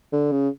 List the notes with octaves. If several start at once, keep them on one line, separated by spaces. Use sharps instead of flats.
D3
C#3